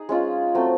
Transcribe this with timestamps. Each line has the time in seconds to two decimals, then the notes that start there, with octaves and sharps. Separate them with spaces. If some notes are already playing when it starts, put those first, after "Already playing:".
Already playing: D#4 G#4
0.09 G#3 C#4 F4
0.54 F#3 A3 C4